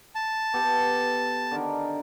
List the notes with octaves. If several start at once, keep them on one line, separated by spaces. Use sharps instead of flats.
A5
B3 G4 A4
D3 D#3 A#4